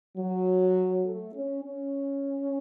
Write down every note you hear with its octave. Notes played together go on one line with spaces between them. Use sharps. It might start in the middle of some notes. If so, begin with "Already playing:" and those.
F#3
A3
C#4
C#4